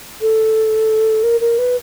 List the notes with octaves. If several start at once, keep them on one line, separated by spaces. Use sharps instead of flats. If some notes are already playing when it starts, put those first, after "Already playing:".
A4
A#4
A#4
B4